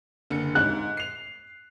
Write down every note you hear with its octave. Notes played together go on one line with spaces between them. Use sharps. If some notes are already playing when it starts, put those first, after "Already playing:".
F#1 D3 C#7
G#2 F#6
C7 F7